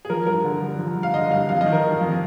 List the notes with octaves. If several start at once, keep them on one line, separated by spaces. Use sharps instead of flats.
G#4
F3 A#4
G2 A#4
D3
G2
F3
G2
F5
D3 D#5
G2 F5
F2 F5
D#5
D#3
A#4
D#3
F2